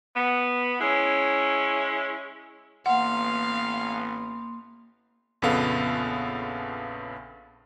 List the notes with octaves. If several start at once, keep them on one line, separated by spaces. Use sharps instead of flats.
B3
G#3 C#4 E4
A1 A#3 B3 F5 F#5 C6
A#1 F2 C#3 B3 A4 F5